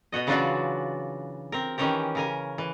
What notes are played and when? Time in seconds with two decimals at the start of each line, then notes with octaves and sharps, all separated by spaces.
0.12 B2 F#4 D#5
0.27 C#3 E3 F#3 D4 F4 F#4
1.52 C4 A#4
1.78 D#3 E3 C#4 G4 A#4
2.15 C#3 A#4 G#5
2.58 E3